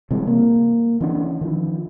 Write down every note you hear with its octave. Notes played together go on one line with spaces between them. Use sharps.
C3 E3 G3 G#3
A#3
E3 C#4 D4
D#3 F3